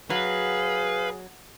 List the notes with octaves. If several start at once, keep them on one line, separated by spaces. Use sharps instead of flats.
F#3 G#4 B4 F5